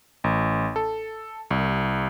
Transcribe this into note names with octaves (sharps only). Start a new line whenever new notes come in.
A1
A4
C2